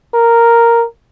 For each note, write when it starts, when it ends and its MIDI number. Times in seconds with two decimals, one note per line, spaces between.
0.14 0.85 70